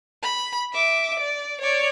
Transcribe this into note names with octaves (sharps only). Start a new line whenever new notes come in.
B5
E5 D6
D5
C#5 D5